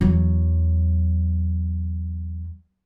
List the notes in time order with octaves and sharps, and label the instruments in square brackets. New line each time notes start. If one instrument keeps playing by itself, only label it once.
[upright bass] E2 F#3